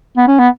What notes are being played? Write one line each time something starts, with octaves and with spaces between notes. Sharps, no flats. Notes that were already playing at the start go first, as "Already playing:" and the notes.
B3
C#4
B3